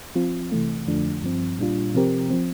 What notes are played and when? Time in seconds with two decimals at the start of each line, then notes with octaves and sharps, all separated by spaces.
0.15 F3 C4 F4
0.52 C3 E3 A3
0.87 F2 D3 F3 A3 D4
1.23 G2 F3 C4
1.59 A#2 G3 D4 F4
1.94 C3 F3 C4 G4 A#4
2.30 F3 C4